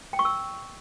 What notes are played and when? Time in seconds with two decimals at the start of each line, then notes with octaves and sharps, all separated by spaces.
0.13 G5
0.19 C#6
0.25 E6